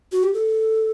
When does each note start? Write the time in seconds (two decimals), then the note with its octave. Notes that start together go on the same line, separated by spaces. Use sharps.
0.12 F#4
0.23 G4
0.34 A4